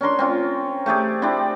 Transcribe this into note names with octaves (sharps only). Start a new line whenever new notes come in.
C#4 D4 A#4 C6
C4 C#4 F4
A3 G4 G#4 D5
C4 D4 E4 D5